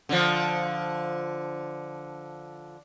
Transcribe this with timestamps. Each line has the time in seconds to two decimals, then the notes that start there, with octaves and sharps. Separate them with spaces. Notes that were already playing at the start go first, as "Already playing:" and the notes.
0.09 D3 F3